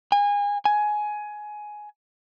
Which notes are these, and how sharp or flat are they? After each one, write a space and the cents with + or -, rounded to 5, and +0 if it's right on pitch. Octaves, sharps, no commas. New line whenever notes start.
G#5 -30
G#5 +15